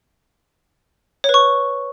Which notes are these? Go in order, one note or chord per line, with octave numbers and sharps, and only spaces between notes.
B4 C#5 C#6